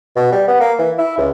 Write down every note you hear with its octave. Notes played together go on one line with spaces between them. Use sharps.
B2
G3
B3
A#3
E3
E4
C#2